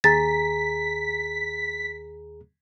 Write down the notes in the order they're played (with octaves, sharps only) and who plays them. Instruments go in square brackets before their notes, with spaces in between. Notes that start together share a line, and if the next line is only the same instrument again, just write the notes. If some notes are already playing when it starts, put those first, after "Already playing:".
[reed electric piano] D#2 G#4 A#5 [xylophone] A6 [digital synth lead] B6